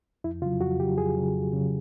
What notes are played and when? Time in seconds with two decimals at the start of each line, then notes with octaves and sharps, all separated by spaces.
0.24 F2 E4
0.42 C#3 F4
0.46 F#3
0.60 F2 F#4
0.79 C#3 G4
0.84 F#3
0.98 F2 G#4
1.17 C#3 F#3
1.34 F2
1.53 C#3 F#3